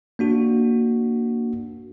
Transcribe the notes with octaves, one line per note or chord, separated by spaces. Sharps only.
A#3 D4 F#4